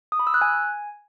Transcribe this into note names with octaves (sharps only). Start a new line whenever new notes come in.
D#6
B5
E6
F#6
G#5